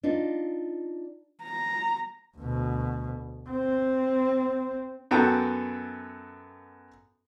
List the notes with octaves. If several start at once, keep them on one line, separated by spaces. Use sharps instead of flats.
D4 D#4 F4
A#5
D2 B2
C4
F#2 B3 F#4 A4 G5 A#5